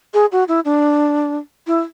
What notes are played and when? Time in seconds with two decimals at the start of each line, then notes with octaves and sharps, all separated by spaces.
0.14 G#4
0.32 F#4
0.48 E4
0.65 D4
1.67 E4